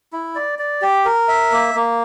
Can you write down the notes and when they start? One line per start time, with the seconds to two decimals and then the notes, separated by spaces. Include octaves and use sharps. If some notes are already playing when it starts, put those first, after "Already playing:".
0.13 E4
0.35 D5
0.59 D5
0.82 G4
1.05 A#4
1.28 E5
1.52 A#3
1.75 A#3